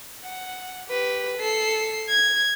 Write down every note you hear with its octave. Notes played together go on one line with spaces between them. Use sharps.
F#5
G4 B4
A4 C7
G#6